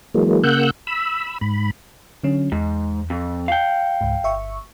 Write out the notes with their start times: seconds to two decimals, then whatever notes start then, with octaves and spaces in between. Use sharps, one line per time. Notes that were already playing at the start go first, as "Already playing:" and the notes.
0.14 E3 F#3 G#3 A#3
0.44 C#3 A#3 F#5 E6 F#6 G6
0.87 B5 E6
1.41 G#2 B5
2.23 D3 F#3 C#4
2.52 E2 G#2
3.10 F2
3.48 F5 G5
4.01 C#2 G#2
4.24 G1 E5 C#6